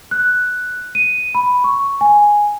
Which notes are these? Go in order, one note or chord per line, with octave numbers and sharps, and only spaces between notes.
F#6
D#7
B5
C#6
G#5